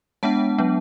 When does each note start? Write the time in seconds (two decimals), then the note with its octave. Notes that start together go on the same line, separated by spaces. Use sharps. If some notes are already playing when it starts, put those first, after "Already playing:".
0.23 G#3 B3 D4 F#5 A5
0.58 F#3 B3 D4